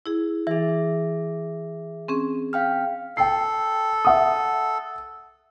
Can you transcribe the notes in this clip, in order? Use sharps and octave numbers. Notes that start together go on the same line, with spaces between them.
E4 G#4
E3 G#4 E5
C4 C#4 G#4
F5 G5 F6
A4 G5 C7
E5 F#5 D#6